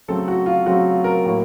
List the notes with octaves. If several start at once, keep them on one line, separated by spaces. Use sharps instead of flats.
C#3 F#3 A3 C4 A4
F#4
F4
C#3 F#3 A3 C4 F#4
A#4
A2 F#3 A#3